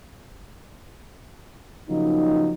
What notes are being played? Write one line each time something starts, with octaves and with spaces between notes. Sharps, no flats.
C#3 F3 F#3 A#3 D#4